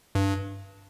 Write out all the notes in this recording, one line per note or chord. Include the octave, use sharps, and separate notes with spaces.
G2